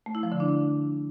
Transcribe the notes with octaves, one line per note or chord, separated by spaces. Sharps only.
A3
E4
F3
D3
D4